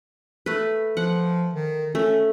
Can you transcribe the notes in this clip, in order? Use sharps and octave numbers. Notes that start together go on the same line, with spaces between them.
A3 B4
F3 F#5
D#3
A3 C#4